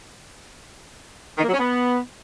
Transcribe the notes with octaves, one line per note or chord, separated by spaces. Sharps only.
D#3
A#3
F#3
C#4
B3